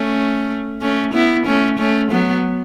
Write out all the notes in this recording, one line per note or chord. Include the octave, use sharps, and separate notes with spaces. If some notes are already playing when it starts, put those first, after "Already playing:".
Already playing: A3 C#4
A3 C#4
B3 E4
A3 C#4
A3 C#4
F#3 B3